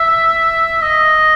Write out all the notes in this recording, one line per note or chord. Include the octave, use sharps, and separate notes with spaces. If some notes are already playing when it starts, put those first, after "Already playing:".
Already playing: E5
D#5